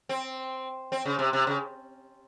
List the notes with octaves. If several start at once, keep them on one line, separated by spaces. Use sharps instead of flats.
C4
C4
C#3
C3
C3
C#3